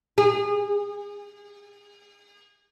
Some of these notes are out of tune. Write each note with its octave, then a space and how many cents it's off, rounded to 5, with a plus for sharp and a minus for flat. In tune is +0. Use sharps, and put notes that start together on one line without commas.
G#4 -30